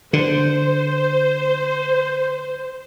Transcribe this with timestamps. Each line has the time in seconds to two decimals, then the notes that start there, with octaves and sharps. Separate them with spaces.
0.13 D3 C5